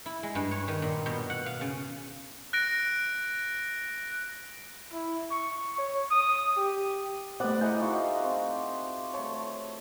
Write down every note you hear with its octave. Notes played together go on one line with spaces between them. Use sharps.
E4
G#3
G2
C#5
D#3
A#2
B2
F#5
F5
C#3
F#6 A#6 D7
E4
C#6
C#5
D#6
G4
G3 A3 B3 C5 D5 F#5
E4 G#4 A#4 D#5 F#5 G6
D#4 F4 F#4
C4
A3 C#5 A5